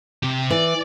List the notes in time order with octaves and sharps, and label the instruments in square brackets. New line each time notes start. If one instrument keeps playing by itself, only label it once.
[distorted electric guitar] C3 G4
[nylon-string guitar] E3 [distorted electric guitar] D5